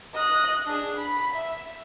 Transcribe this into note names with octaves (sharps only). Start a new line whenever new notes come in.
D#5 F#6
D4 G#4
B5
E5